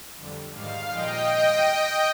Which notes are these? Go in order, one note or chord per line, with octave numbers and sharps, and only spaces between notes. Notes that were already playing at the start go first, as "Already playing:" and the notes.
F2 D3 G3
G#2 D#3 G3 F5
A#2 F3 G#3 D#5 G5